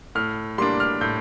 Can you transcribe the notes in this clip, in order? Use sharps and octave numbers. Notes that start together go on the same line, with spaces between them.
A2 F6
G3 A#3 D4 C6
F6
A2 G6